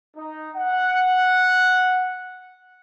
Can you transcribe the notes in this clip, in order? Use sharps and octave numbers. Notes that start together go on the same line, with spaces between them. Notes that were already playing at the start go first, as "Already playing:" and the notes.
D#4
F#5